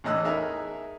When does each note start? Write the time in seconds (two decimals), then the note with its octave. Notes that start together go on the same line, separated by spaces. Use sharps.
0.04 E2 A2 D#5 E6 F#6
0.24 D#4 G#4 A#4 E5